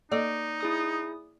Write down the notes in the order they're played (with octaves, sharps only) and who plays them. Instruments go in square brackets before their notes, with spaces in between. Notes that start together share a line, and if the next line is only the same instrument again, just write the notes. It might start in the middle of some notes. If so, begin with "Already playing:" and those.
[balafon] A#3 A4 D#5 [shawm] D#4 [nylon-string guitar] D5
[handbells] E4 G#4 D#6